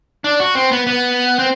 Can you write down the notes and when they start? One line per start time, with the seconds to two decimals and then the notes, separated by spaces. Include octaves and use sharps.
0.24 D4
0.40 F#4
0.55 C4
0.72 B3
0.87 B3
1.39 C4